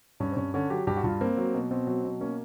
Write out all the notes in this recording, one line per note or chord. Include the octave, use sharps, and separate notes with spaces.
G2 C#4
C4
G2 C#4
D3 C#4
F#3 G4
G2 G4
F#4
G2 F4
A#3 C4
F#3
B2
B2 C4
F#3
B2
A#3 C#4